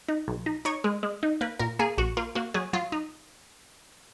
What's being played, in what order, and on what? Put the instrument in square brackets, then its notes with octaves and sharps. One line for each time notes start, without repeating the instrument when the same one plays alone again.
[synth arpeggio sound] D#4
B1
D#4
D#4 C#5
G#3
G#3
D#4
A#3 B4
A#2 A#4
A#3 G#4
A#1 F#4
A#3 F4
A#3 F#4
F#3 G#4
F#3 F4
D#4